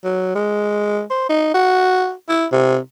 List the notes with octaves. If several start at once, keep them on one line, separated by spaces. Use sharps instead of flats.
F#3
G#3
C5
D#4
F#4
E4
C3